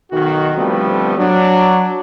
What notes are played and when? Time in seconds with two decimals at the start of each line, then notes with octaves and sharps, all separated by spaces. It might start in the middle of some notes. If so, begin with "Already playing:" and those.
0.12 B1 D#3 F#4
0.57 D3 F3 G3 A3 B3 C4
1.18 F#3 D4